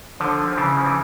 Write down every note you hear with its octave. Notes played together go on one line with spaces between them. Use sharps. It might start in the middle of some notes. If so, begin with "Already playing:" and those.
D3 F3
F3
C#3 E3
F3
E3